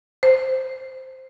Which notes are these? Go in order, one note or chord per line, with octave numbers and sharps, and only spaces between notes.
C5